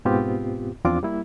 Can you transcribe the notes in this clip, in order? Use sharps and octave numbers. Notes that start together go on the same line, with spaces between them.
G#2 B2 B3 C4 F4 G4
E2 F3 C4 D4 F4 D6
G3 A#3 E4